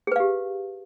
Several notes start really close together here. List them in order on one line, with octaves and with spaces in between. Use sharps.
G#4 B4 F5 G4